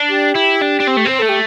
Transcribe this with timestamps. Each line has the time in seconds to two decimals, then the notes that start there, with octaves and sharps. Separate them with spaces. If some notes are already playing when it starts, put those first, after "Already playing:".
Already playing: D4
0.09 G4
0.36 E4
0.62 D4
0.80 D4
0.88 C4
0.97 A3
1.06 C4 C5
1.19 A3 A4
1.29 G4